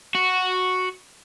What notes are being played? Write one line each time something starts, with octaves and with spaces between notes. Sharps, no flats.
F#4